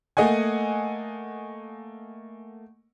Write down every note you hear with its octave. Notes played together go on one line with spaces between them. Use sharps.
A3 A#3 D#5 F#5 G#5